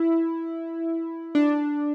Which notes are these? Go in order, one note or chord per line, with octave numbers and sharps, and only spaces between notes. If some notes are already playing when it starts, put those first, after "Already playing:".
Already playing: E4
D4